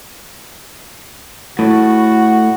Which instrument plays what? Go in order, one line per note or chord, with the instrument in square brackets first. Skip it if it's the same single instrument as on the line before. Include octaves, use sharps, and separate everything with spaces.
[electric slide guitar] A2 [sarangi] F#4